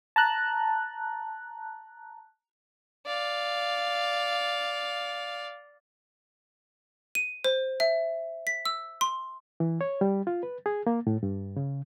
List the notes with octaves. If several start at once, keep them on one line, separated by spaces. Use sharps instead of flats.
A5 A#5 F#6
D5 F5
D#7
C5
E5
B6
E6
C6
E3
C#5
G3
F4
B4
G#4
A#3
A2
G2
C#3